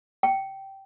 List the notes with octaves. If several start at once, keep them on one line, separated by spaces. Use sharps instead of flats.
G5